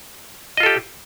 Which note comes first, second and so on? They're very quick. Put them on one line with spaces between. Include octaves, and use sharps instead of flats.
D#5 F4 A4 G4